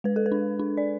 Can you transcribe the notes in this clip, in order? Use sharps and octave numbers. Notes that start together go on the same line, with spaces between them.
G#3 B4
A4
B4
D4
D4
D5